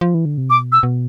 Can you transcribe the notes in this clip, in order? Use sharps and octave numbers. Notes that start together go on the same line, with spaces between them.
F3
E3
D3
C3
B2 D6
E6
B2